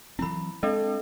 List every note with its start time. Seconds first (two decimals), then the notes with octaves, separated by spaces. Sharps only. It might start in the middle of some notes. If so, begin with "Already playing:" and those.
0.19 E3 F#3 C4 E4 B5
0.63 G#3 C4 D4 A4 D#5